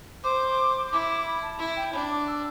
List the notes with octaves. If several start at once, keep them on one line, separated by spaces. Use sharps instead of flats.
C5 D6
C6
E4 D6
B5
A5
E4
G5
D4 B5
D6
E6